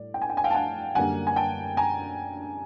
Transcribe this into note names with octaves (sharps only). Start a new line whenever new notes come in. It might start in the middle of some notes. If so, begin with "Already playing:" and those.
Already playing: A2 G3 D5
G5
G#5
G5
G#5
F5 G5
A5
F#5 G#5
F#2 D3 G3 A#3 F#5 G#5
G#5
G5 A5
G#5 A#5